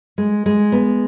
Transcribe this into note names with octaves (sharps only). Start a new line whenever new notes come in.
G#3
G#3
B3